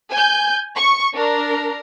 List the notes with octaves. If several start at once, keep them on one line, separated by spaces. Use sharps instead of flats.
G#5 G6
C#6
D4 A#4